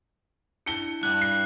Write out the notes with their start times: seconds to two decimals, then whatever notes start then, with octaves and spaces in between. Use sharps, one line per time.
0.66 D4 E4 A5 C#7 G7
1.03 G2 F#6
1.21 C7